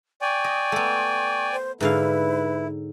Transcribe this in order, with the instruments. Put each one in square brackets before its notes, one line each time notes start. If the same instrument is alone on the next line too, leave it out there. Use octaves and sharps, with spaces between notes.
[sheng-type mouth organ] D5 G5 G#5 [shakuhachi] C#6
[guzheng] D#5
A3 B3
[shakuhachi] C5
[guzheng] G#2 D3 F5 [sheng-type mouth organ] E4 [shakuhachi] B4